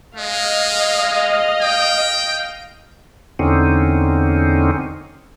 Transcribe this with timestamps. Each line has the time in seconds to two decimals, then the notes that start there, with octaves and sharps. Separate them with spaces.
0.16 G#3 D#5 F5
1.61 G5
3.39 E2 D3 C4 C#4 D#4